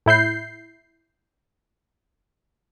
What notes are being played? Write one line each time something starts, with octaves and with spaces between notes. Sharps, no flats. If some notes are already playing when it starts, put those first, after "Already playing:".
A2 E4 G6 C7